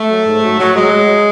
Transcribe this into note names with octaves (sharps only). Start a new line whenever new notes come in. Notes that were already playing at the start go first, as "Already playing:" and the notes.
Already playing: A3
F#3
G#2
F#3
A2 F#3
F#3 G#3